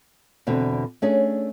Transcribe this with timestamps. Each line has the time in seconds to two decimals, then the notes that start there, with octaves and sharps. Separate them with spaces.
0.47 E2 B2 D3 C4
1.02 A3 C#4 D4 G#4